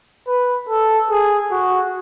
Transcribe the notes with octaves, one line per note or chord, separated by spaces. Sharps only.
B4
A4
G#4
F#4